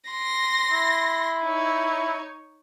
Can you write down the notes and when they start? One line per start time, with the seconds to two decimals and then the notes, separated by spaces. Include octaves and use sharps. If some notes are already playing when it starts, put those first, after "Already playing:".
0.10 C6 A#6
0.72 E4
1.43 D#4 C#5